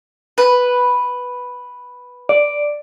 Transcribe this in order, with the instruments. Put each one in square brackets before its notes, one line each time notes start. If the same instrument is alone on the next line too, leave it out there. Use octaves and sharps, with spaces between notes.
[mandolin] B4
[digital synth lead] D5